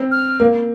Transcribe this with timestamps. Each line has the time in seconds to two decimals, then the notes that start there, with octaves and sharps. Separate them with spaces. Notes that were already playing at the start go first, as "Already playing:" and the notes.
Already playing: C4
0.11 F6
0.40 A#3